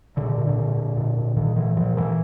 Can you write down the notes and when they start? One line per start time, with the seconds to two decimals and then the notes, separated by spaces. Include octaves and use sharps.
0.17 A#2 D3
0.38 A#2
0.47 D3
0.58 A#2
0.77 A#2
0.97 A#2
1.17 A#2
1.37 A#2 D#3
1.56 A#2 E3
1.76 A#2 F3
1.96 A#2 E3